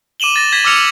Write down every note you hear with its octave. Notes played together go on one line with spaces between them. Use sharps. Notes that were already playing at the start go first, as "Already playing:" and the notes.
D6 D#7 E7 F#7 G7
A6 A#6
G#6 A#6 B6
D6 E6 F6 C#7 F7 G7
C#7 F#7